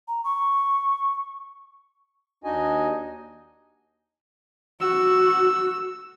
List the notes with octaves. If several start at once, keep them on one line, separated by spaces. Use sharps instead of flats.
A#5
C#6
D#2 D4 D#4 F#4 D#5 G#5
F#4 E6